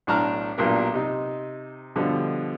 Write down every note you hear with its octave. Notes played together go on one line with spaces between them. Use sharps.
B1 A2 D4 A5 A#5 F6
B1 A#2 D4 G4 A#4
C3 D#4
B2 D3 F3 G3